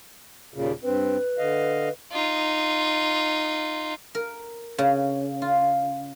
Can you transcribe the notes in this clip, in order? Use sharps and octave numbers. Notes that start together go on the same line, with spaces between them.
D#2 A#2 C#3
G2 C4 B4
D3 D#5 F5
D#4 F4
A#4
C#3
F4